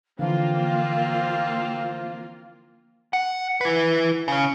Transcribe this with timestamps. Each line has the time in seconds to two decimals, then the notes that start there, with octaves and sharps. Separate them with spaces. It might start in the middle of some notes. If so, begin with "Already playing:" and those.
0.19 D3 E3 F3 A#3 C4 F4 F5
3.13 F#5
3.61 E4 B4
4.28 C#3 C#4